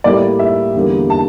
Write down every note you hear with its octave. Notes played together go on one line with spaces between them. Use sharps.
A2 G3 A#3 D5
E5
E2 D3 G3 A#3
A5